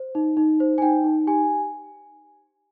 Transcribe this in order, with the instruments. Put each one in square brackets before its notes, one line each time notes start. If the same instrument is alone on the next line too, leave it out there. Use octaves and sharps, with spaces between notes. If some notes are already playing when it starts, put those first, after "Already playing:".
Already playing: [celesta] C5
D#4
D#4
C5
G#5
D#4 G5
D#4
G4 G#5